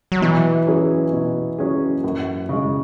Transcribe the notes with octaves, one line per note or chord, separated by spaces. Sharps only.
F#3
B2 E3
F#3 C#4 G#4
B2
F#3 C#4 G#4
F#2
C#3 G#3